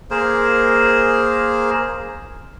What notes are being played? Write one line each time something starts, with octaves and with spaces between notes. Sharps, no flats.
A#3 G#4 A#4 C5